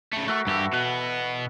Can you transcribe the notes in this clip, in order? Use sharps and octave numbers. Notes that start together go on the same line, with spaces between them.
C#3 A3
A3 F#4 A#4 E5
G2 E3 G4 A4 E5
B2 B3 F#5